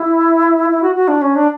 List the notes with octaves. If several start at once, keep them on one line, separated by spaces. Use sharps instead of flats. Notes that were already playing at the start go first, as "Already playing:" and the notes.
Already playing: E4
E4
F#4
F#4
D4
C#4
D4